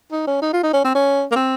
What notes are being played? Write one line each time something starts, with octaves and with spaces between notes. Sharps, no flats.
D#4
C#4
D#4
F4
D#4
C#4
C4
C#4
A#3
C4